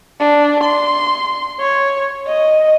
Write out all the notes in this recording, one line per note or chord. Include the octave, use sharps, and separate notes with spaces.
D4
C6
C#5
D#5